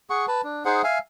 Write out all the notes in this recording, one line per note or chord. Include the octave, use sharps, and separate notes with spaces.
G#4 F#5 C#6
B4 A5
D4
D#4 G#4 C5 F#5
E5 F5 G#5